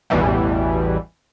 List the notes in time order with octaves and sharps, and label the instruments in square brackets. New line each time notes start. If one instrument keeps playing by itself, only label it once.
[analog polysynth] A1 E2 B2 E3 G3